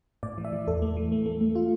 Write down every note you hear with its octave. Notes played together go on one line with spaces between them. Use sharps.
A2 D5
E3
E5
E3
E2 A4
A3
E3
A3
A3
A3
F4